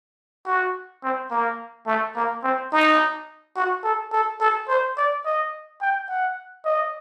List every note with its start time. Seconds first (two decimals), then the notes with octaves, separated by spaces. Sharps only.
0.46 F#4
1.03 C4
1.31 A#3
1.87 A3
2.16 A#3
2.44 C4
2.72 D#4
3.56 F#4
3.84 A4
4.12 A4
4.41 A4
4.68 C5
4.97 D5
5.26 D#5
5.82 G5
6.09 F#5
6.65 D#5